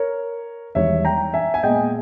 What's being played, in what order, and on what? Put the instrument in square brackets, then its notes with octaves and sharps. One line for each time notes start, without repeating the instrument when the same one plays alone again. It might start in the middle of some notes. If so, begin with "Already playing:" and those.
Already playing: [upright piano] A#4 C#5
E1 E2 D#3 G3 C#5 E5
G5 A#5
E5 G#5
G#5
A#2 G#3 B3 D#5 G5